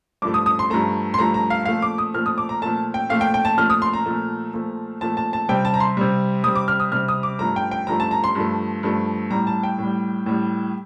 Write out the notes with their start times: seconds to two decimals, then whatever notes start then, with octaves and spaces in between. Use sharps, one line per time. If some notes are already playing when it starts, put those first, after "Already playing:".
0.22 G2 F3 A3 D6
0.34 D#6
0.46 D#6
0.59 C6
0.70 G2 F3 A3 A#5
1.14 C6
1.18 G2 F3 A3 A#5
1.34 A#5
1.50 F5
1.65 A#2 F3 A3 F5
1.82 D6
1.98 D#6
2.14 A#2 F3 A3 F6
2.26 D#6
2.38 D6
2.49 A#5
2.62 A#2 F3 A3 A5
2.94 G5
3.09 A#2 F3 A3 F5
3.21 G5
3.34 G5
3.45 A5
3.57 A#2 F3 A3 F6
3.70 D#6
3.82 C6
3.93 A#5
4.06 A#2 F3 A3
4.53 A#2 F3 A3
5.01 A#2 F3 A3 A5
5.17 A5
5.33 A5
5.49 C3 G3 G5
5.65 A5
5.74 A#5
5.80 C6
5.97 C3 G3
6.44 C3 G3 D#6
6.55 D6
6.68 F6
6.80 D#6
6.92 C3 G3 F6
7.08 D#6
7.23 D6
7.39 G2 F3 A3 A#5
7.56 G5
7.71 G5
7.87 G2 F3 A3 A#5
8.00 A5
8.11 A#5
8.24 C6
8.35 G2 F3 A3
8.83 G2 F3 A3
9.31 A2 G3 A#5
9.47 A5
9.63 G5
9.78 A2 G3
10.26 A2 G3